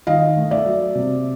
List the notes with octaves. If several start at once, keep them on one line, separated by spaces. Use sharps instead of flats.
D#3 D#5 F5
A3
D5 E5
F#3
C3